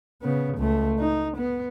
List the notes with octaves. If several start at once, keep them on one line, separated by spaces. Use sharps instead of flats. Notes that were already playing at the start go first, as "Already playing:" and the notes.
C#3 B3
C#2 A3
D#4
B3